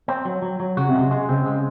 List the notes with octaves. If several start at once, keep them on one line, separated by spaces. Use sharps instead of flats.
C4
F#3
F#3
F#3
C#3 F#4
C3
C#3 G#3
G#3
C#3 C4
G#3